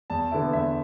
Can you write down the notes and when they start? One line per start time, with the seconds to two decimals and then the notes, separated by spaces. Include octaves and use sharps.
0.10 E2 A5
0.31 D3 B3 E4
0.53 E2 E5